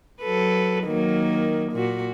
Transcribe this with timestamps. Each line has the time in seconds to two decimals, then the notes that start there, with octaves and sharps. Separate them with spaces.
0.22 F#3 A4 B4
0.85 D#3 F#3 A#3
1.73 A#2 F#4